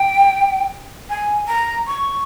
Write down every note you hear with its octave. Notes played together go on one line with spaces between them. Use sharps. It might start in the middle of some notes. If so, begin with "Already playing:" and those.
Already playing: G5
G#5
A#5
C#6